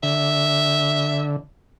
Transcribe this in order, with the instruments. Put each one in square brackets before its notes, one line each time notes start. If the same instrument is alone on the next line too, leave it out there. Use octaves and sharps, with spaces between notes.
[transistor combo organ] D3 [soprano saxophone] E5